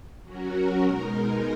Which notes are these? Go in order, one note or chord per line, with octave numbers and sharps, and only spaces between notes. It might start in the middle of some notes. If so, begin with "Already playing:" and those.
F#3 C#4 F#4 A#4
B2 G#3 D#4 A#4